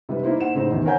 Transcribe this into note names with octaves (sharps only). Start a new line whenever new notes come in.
C3 G3 B4
A#3 D#4 E4 C5
C5 F#5 E7
A2 C#3 C4 D#4
G#1 E2 C3
A#4 C#5 F#5 G#5 A#5 G6